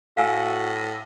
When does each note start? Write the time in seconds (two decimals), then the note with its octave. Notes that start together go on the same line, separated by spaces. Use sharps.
0.17 A2 F#4 F5 G#5 E6